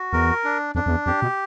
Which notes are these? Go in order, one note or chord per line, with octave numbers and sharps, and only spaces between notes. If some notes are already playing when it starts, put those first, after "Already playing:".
Already playing: F#4
E2 A#4
D4
F2 D4
F2
E2
F2 G4
B2